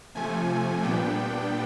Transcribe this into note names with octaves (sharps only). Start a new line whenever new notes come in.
C3 F3 A3 G#5
A#2 G3 B3 D4 G5